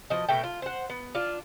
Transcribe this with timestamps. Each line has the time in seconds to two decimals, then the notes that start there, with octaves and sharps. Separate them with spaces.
0.10 B2 F3 D#5
0.29 B2 A3 G5
0.44 F4
0.62 C5 F#5
0.90 B3
1.15 D4 F4